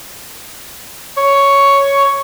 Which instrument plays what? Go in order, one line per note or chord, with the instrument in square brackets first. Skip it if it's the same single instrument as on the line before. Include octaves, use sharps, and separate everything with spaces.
[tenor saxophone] C#5